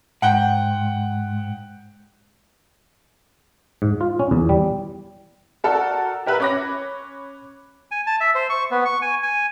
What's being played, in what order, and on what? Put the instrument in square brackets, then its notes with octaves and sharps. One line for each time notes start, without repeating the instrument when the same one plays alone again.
[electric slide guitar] G#2 [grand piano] F#5 G5 G6
[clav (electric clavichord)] G#2
F4
C#4
E2
G3
[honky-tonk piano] F#4 A4 A#4 D5
G4 A#4 B4 E5
C#4 C#5 B5 D6 F#6 A#6
[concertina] G#5
A5
E5
C5
C#6
B3
C#6
G#5
G#5